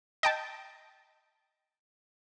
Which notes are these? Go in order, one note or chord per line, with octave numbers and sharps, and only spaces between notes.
D#5 G5 A5